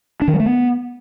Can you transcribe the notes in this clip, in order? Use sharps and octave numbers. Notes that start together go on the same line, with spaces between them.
D4
D#3
G3
A3
B3